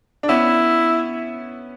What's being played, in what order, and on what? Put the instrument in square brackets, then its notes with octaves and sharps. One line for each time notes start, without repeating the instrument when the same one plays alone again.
[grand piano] D4
[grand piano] B3 C#4 [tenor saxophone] E4